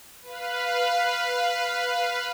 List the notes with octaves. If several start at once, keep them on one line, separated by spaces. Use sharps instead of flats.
B4 F5